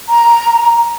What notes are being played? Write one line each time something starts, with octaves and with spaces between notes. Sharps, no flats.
A#5